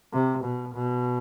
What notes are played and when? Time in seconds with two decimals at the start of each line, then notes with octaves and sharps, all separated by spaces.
0.13 C3
0.44 B2
0.75 B2